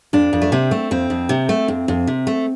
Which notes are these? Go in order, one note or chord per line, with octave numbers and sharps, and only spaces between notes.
F2 D4
F2
A3
C3 C4
A3
F2 C4
F2
C3
A3
F2
F2
C3
A3